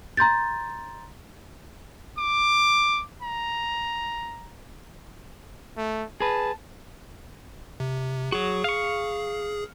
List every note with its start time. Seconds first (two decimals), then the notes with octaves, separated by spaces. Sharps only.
0.17 A#5 C6 G6 A6
2.19 D6
3.22 A#5
5.77 A3
6.20 G#4 B4 A5
7.80 C3
8.32 F#3 F#4 G#4
8.64 F5 C#6